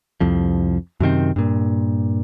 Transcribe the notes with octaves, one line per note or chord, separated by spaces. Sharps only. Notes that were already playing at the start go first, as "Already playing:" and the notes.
C2 F2 F3
F#2 C3 D#3 C4
G2 A#2